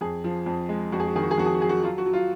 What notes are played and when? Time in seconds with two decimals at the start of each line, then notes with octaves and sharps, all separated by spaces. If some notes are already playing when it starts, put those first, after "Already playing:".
0.01 F2 G#4
0.24 F3
0.46 F2
0.69 G#3
0.92 F2 F#4
1.00 G#4
1.07 F#4
1.15 D#3 G#4
1.23 F#4
1.31 G#4
1.38 F2 F#4
1.46 G#4
1.55 F#4
1.61 F#3 G#4
1.69 F#4
1.83 F#3 F4
1.98 F#4
2.06 F#3
2.13 F4